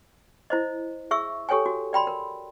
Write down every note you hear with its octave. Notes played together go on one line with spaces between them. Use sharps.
E4 C5 D#5
G#4 E5 C#6 E6
G4 A4 C#5 G5 G#5
F#4
D5 G5 B5 C6
A#4